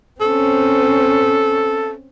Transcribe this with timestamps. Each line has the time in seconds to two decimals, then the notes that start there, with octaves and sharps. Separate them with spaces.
0.21 C4 C#4 A4